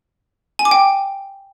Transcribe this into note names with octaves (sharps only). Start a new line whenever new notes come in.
G#5
D6
G5